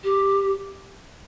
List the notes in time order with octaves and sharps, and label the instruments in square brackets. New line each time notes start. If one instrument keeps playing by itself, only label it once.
[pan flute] G4